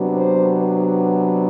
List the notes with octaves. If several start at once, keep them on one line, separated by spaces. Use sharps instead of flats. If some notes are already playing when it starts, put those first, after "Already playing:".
Already playing: C3 F#3 B3 D4
C5
B4